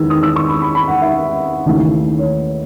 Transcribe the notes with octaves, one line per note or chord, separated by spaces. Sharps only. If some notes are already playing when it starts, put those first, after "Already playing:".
Already playing: E2 D#3 G#3 E6 G#6
D#6
E6
C#6
B5
B5
B5
F#5
E5
D#2 C#3 E3 A3
C#5